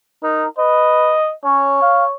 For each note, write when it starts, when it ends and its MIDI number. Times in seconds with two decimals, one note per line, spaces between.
0.23 0.45 63
0.23 0.47 70
0.58 1.17 71
0.58 1.32 75
1.44 1.78 61
1.44 2.14 73
1.82 2.05 77